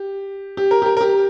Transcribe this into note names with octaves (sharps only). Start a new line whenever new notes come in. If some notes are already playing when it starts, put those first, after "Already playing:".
Already playing: G4
G4
A#4
G4
A#4
A#4
G4